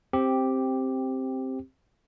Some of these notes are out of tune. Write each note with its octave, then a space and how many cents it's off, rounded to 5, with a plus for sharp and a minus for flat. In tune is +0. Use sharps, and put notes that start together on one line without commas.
C4 +5 G4 +0